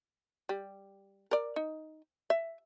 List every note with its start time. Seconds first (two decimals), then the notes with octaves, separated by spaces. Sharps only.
0.49 G3
1.31 A#4 D5
1.56 D#4
2.30 E5